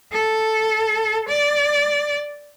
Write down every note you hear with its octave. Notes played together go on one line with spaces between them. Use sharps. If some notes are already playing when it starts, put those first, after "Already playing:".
A4
D5